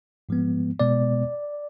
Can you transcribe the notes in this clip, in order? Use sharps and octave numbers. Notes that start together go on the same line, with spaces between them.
G#2 F3 G#3 B3
B2 G#3 B3 D5